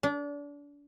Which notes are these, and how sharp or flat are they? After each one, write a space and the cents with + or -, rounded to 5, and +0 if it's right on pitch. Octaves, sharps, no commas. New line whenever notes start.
D4 -30